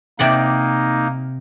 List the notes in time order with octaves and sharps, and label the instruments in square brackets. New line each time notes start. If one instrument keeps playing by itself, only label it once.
[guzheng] C3 D5 F#5 [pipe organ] A#3 D#4